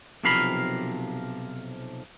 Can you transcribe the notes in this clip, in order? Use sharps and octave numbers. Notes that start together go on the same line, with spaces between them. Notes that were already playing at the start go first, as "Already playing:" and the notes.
B1 C3 F3 A#4 F5 B5